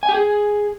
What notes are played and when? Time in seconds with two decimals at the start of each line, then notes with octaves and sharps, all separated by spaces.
0.03 G#5
0.09 G4
0.14 G#4